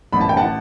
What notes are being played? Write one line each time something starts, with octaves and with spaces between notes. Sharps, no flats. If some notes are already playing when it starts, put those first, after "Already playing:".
A1 B5
A5
G5
F#5 A5